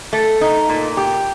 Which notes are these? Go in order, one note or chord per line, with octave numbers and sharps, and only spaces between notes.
A3
D#4
A#2
G4